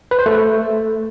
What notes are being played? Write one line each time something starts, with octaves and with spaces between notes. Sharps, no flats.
B4
C5
A3